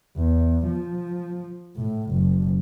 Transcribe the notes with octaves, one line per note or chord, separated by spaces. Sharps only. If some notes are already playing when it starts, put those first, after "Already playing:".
E2
F3
A2
F#1